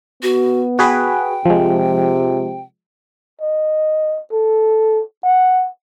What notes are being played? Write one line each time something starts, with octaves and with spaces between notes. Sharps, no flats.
B3 F#4
F#4 G#4 B4 G5
C3 F3 G#3
D#5
A4
F#5